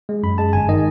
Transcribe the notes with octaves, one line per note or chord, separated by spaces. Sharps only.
G#3
F#2 B5
G#3 A5
G1 G#5
D#3 D#5